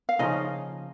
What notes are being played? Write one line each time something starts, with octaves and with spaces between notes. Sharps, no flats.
F5
C#3 F3 A#3 C#4 D#4 D#5